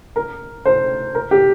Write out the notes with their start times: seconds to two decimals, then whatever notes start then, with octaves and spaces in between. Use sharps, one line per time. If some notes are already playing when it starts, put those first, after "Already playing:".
0.16 A#4
0.65 C5
1.15 A#4
1.31 G4